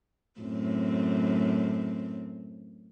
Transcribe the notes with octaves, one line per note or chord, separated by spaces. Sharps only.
F#2 A2 C4